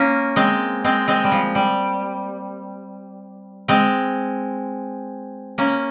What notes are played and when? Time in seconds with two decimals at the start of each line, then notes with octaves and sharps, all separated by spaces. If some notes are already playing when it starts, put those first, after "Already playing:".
Already playing: A#3 C#4
0.36 G#3 C4
0.84 G#3 C4
1.08 G#3 C4
1.24 G3
1.31 F3
1.55 G3
3.68 G#3 C4
5.58 A#3 C#4